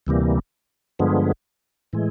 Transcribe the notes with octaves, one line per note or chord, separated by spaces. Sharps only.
D2 C3 E3 G3 A#3
G2 D3 F3 G#3 B3
A2 E3 G#3